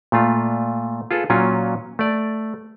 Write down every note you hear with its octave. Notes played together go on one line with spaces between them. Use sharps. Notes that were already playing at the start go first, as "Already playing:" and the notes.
A#2 A3 F4
F4 G#4 A4 B4
A#2 F#3 C#4 F4
A3 D5